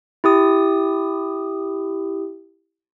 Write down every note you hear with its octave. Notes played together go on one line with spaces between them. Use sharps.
E4 G4 D#6